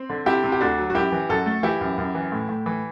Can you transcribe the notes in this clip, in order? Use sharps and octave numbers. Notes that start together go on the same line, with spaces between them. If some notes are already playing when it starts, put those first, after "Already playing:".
Already playing: C4
D3
C3 E4 G4
C3
G4
D2 D4 F#4
F#3
F#4
F#2 E4 G4
E3
F#2 F#4 A4
A3
E3 E4 G4
F#2
F#2
E3
A2
A2
E3